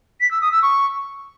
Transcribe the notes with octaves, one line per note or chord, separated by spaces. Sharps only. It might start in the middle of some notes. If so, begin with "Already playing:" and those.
B6
E6
D#6
E6
C#6